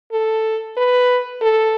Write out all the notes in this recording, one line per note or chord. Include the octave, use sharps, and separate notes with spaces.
A4
B4
A4